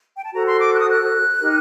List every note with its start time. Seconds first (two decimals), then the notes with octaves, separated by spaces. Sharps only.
0.17 G5
0.24 A5
0.33 F#4 A4 C5 A#5
0.47 C6
0.60 D6
0.74 F#6
0.81 D#6
0.88 F#6
1.41 D#4 G4 A#4